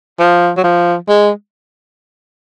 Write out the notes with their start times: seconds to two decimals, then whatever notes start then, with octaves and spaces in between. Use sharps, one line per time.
0.19 F3
0.57 F#3
0.63 F3
1.09 G#3